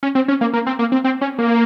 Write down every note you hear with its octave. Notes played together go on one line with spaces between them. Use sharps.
C#4
C4
C#4
A#3
A#3
C4
A#3
C4
C4
C#4
A#3